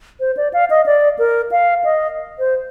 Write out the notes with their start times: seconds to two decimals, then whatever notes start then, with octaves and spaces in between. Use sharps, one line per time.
0.20 C5
0.37 D5
0.53 F5
0.70 D#5
0.86 D5
1.19 A#4
1.52 F5
1.84 D#5
2.39 C5